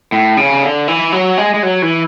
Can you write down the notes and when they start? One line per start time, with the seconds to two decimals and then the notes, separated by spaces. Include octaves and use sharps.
0.12 A2
0.37 C#3
0.63 D3
0.88 E3
1.12 F#3
1.38 G#3
1.54 G#3
1.63 F#3
1.82 E3